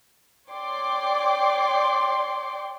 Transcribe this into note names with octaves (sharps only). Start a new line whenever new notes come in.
C#5 D5 G5 C6 D6